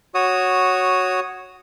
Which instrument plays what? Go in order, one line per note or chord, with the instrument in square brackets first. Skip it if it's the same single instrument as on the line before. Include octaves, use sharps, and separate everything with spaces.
[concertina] F#4 C#5 D#6